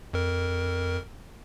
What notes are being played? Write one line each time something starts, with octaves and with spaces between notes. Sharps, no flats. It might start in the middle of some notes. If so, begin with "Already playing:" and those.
F2 A#4